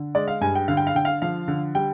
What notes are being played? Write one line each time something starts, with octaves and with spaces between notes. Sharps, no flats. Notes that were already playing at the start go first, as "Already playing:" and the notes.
Already playing: D3
G#3 D5
F5
G2 G#5
G5
D3 F5
G5
F5
D3 G5
F5
F3 F5
D3
G3 G5